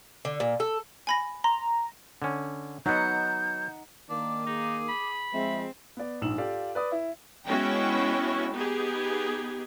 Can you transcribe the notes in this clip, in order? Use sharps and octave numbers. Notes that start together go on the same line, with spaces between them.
D3
A#2
A4
G#5 B5 A#6
A#5 C6
D3 C#4
F#3 B3 D#4 F#5 G6
D#3 A#3 D4 D6
D#4 G#4
B5
F3 G#3 C4 E5
B3 D5
A#1 G#2 E6 E7 F#7
F4 G4 A4 D5 F5
B4 D5 D#6
E4
G#3 B3 C#4 E4 F#4 G5
B3 D#4 G4 G#4